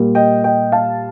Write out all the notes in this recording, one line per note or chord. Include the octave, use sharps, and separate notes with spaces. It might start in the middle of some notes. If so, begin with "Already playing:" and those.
Already playing: A#2 G3 A#3
D#5 G5
D#5 G5
F5 A5